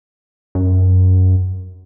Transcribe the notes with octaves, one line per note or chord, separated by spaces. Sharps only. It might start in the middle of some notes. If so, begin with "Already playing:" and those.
F#2